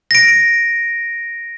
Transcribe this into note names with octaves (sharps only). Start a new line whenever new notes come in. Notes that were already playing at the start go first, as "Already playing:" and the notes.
A#6 D7